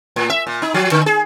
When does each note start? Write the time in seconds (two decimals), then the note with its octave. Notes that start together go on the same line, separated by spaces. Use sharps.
0.16 A2
0.30 E5
0.47 A#2
0.62 D#4
0.74 F3
0.92 D3
1.06 G#4